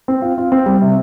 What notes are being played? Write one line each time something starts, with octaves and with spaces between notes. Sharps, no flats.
C4
F4
F4
C4
G3
C3